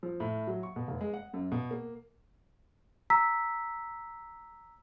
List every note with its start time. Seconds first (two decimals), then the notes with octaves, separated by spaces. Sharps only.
0.03 F3
0.20 A2
0.47 F#3
0.63 C#6
0.76 B2
0.88 F1
1.01 G#3
1.14 F#5
1.33 F#2
1.52 B2
1.71 A#3
3.10 A#5 E6 B6